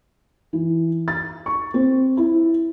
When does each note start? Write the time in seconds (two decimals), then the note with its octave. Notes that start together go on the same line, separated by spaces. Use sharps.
0.53 E3
1.08 A6
1.46 C#6
1.74 C4
2.17 E4